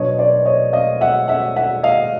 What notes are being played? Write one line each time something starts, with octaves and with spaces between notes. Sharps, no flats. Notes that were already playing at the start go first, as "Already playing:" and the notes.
Already playing: B2 F#3 B3 D4 C#5 D#5
C5 D5
C#5 D#5
D#5 F5
E5 F#5
E5 F#5
E5 F#5
D#5 F5